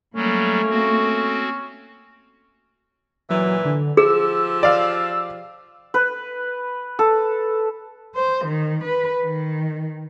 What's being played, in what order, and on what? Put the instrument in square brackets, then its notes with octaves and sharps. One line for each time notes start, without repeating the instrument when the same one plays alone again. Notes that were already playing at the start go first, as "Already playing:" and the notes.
[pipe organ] F#3 G3 [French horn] A3 [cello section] A#3 [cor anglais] C#4
[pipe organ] C4 F#4
[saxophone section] A#2 E3 [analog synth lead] F#3
[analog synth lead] D3
[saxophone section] F3 F4 G4 [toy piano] G#4 [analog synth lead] E6
[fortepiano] D5 F5
[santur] B4
A4
[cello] C5
D#3
B4
D#3